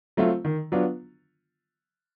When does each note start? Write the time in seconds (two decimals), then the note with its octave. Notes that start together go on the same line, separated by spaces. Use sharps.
0.17 F#3 A3 C4 F4
0.45 D#3
0.72 F#3 B3 D4 F4